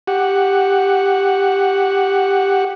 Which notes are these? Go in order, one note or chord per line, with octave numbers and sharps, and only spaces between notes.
G4 F#5